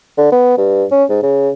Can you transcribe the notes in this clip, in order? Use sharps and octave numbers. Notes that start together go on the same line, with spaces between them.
D3
B3
G2
C#4
G#2
C#3